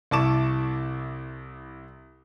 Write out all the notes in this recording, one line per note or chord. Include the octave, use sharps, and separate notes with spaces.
C2 E4 A5 C#6 D6 E7